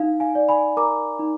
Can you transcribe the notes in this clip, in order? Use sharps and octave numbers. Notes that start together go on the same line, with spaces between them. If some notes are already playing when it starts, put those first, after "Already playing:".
Already playing: D#4 F5
F5 G#5
D5
G#5 B5
A#4 A#5 D6
D#4